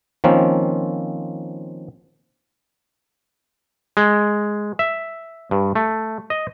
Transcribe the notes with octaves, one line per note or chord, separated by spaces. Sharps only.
D#3 F3 A#3 C4 C#4
G#3
E5
G2
A3
D#5